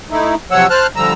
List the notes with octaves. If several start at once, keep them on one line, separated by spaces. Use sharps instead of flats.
A3 D#4 E4
C3 F3 F#3 C#5 F#5 E6
C5 A5 F6 F#6
D3 F3 G3 A#5 E6